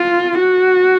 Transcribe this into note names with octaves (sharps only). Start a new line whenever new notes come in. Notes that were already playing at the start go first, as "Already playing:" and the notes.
Already playing: F4
F#4